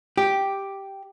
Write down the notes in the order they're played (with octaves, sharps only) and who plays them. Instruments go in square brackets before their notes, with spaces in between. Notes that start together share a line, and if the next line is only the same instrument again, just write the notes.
[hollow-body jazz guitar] G4